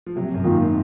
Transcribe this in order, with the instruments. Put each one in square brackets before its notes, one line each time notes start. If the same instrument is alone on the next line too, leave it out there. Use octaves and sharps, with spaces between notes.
[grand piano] F3
[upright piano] C3 [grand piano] F#3
[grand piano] F#2
[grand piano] G#2 [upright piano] D#3 A#3 F4